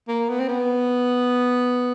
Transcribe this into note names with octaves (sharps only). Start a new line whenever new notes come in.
A#3
B3
C4
B3